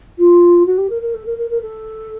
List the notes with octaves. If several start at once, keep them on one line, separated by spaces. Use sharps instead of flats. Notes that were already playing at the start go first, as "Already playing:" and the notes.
F4
F#4
G4
A#4
A#4
A4
A#4
A#4
A#4
A4